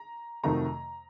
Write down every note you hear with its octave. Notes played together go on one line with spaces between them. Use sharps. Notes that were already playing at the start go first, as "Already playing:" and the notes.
Already playing: A#5
F2 C3 D#3 F#3 A3 A#5